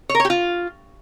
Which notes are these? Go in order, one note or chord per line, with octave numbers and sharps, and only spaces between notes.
C#5
A#4
C#5
G4
F4